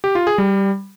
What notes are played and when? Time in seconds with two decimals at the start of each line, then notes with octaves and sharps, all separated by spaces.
0.04 G4
0.15 F4
0.27 G#4
0.38 G3